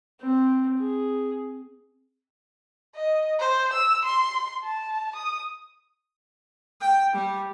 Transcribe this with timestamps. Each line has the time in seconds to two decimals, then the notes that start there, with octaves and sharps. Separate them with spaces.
0.21 C4
0.79 G#4
2.96 D#5
3.39 C5
3.74 E6
4.06 C6
4.64 A5
5.16 D#6
6.81 G5
7.14 G3